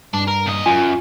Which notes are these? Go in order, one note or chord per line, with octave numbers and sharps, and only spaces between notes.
G2 D4
A#4
A#2 D#5
F#2 F4 G#5